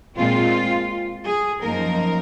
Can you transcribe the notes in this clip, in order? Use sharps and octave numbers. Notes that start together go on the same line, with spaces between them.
A#2 G#3 C4 F4
G#4
F#2 F3 A#3 D#4 A#4